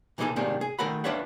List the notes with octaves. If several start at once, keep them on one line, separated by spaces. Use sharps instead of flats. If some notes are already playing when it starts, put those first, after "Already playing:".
A#2 E3 A#3 D#4 G#4 A4
G#2 C3 D#3 A3 A#3 D4
G#4
D#3 A3 A#4 F#5 B5
D4 F4 B4 C#5 E5 F#5